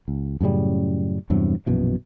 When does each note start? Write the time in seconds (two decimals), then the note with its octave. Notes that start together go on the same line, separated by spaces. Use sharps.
0.08 C#2
0.41 F#2 A2 C#3 G3
1.30 E2 G2 C3 F#3
1.66 A#1 F#2 B2 E3